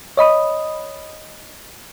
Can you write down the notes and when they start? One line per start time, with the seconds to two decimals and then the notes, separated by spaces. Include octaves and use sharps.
0.17 C#5 D#5 B5 D#6